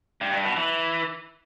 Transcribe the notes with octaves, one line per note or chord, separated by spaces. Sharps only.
G2
G2
B2
E3